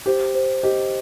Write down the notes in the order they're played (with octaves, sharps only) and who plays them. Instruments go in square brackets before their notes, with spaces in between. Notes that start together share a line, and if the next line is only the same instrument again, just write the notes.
[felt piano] G4 [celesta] C5
[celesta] C5
[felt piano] G4 [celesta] D#5